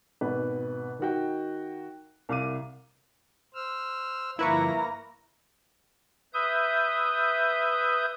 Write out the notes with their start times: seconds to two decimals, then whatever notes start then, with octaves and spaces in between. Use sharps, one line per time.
0.21 G#1 B2 B4
0.99 D#3 D#4 F#4 G5
2.29 C2 F5 D6 D#7
3.55 C5 E6 F6
4.39 G2 D3 F3 A#3 E4 B4 A#5 C#6
6.34 B4 E5 D#6 G6